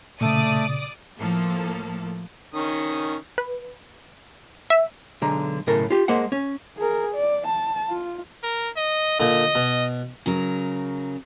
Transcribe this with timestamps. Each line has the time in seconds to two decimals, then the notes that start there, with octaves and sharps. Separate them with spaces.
0.21 A#2 C#3 A3 D5 D6 D#6
1.18 A2 F3 A#3 A4
2.54 D#3 C#4 D#6
3.38 B4
4.70 E5
5.22 B1 D3 G#3 A#5
5.67 B1 A2 C#3 A4 A#4
5.90 F4 G4
6.08 G#3 A#3 C5 F#5
6.32 C#4
6.77 G#4 A#4
7.15 D5
7.47 A5
7.89 F4
8.43 A#4
8.77 D#5
9.20 A#2 D3 D#5
9.55 B2
10.26 C#3 F#3 A#4